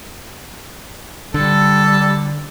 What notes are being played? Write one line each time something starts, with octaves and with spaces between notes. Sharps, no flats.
D3 G3 A4